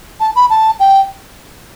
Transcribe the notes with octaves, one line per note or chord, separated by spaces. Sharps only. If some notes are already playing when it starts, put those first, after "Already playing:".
A5
B5
A5
G5